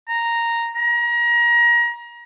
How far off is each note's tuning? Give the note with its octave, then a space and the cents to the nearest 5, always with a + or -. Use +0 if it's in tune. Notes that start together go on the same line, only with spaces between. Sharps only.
A#5 -5
A#5 +30